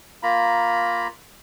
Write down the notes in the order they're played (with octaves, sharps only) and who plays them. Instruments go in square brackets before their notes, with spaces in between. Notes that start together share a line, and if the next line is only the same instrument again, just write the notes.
[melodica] A#3 F4 A#5 B5